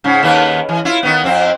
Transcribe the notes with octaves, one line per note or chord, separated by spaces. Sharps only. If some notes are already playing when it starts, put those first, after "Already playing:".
G#2 C#3
D#2 D#3 B4
E3
E4 F4
D#3 B3
F2 C4